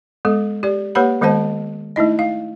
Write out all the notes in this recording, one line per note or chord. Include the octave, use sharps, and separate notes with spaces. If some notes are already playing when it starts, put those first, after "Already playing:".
G#3 B3 A4
G4 D5
A#3 G4 B4 C#5 F#5 B5
D#3 G#3 B3 C5 D#5 A5
A3 D#4 E4 D#5
F5